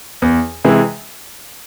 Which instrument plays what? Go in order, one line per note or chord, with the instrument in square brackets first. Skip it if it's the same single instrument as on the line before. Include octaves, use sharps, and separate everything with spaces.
[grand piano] E2
C3 E3 G#3